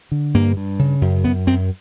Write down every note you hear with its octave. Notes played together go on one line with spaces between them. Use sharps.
D3
G2 A#3
G2
C#3
F#2
F#2 B3
F#2 C4